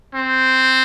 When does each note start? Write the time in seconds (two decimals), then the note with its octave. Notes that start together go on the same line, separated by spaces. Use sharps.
0.15 C4